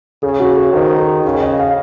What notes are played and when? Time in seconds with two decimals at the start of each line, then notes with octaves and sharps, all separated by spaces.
0.23 C#3 G#4
0.40 F#4
0.56 G#4
0.73 D#3 C5
1.00 G#4
1.25 C#3 C#5
1.42 D#5
1.59 F5